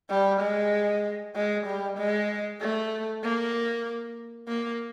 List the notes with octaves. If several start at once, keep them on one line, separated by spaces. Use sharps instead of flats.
G3
G#3
G#3
G3
G#3
A3
A#3
A#3